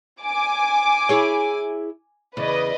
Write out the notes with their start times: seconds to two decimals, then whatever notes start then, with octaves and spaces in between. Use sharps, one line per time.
0.22 G#5 D6
1.09 E4 G#4 C#5
2.37 E2 C#3 B4 D5 D#5